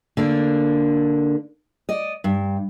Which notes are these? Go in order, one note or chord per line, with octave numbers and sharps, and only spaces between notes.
D3 A#3 D4
D5 D#5
G2